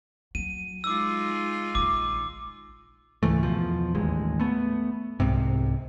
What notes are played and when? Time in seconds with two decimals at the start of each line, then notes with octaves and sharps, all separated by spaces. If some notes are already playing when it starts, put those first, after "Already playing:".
0.35 F#3 D#7
0.84 G#3 D#4 F4 D6 E6
1.75 A#1 D#3 D6
3.23 C#2 G#2 E3 A3
3.43 E2 B2 F3
3.95 A1 D#2 G#3
4.40 A3 B3
5.20 C2 G#2 C3